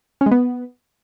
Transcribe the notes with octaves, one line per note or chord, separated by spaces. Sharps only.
C#4
G#3
B3